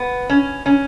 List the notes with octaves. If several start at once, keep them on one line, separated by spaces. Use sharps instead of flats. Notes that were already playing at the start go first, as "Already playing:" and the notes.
Already playing: B3
C#4
C#4